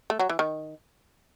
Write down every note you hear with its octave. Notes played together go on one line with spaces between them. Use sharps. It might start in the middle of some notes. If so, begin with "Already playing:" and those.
A3
F#3
E3
D#3